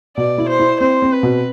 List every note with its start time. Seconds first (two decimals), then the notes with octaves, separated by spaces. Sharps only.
0.17 B2 D5
0.38 E4
0.50 C5
0.59 E4
0.81 C4 C5
1.02 C4
1.13 B4
1.23 B2